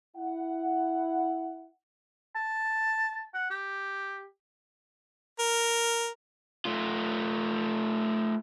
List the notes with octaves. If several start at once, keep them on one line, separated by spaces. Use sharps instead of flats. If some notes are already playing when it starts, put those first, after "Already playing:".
E4 F#5
A5
F#5
G4
A#4
A3 F4